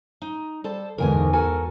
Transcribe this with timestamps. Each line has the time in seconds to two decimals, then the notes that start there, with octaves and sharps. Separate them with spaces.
0.22 D#4
0.64 G3 A4 C5 A5
0.98 E2 G#2 D3 A#4 G5 G#5
1.33 F#4 A4 A#4 G#5